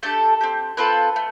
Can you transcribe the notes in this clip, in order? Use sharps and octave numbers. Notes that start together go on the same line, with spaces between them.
A3 D4 G4 A4
C4 G4
C4 F4 A4 B4
A3